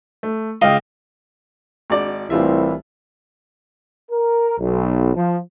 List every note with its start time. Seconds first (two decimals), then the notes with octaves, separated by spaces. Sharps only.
0.23 A3
0.62 C#2 D#5 F5 G5
1.90 G#1 F#4 D5
2.30 C2 A2 E3 F4 E5
4.12 A#4
4.59 B1
5.16 F3